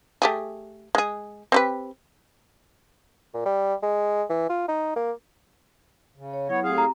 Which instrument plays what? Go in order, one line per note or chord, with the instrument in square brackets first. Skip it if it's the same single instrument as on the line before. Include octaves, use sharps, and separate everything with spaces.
[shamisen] A3 G4 G#4
G#3 G#4
C4 G4 B4
[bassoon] A#2
G3
G#3
E3
F4
D#4
A#3
[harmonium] C#3
[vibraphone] C#5
[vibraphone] F#3 E4 F#5 [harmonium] B3 C#5
[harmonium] A2 G#4 F5 [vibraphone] C4 G4
[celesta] A#5